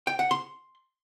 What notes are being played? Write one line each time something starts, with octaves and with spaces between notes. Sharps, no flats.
G5
F#5
C6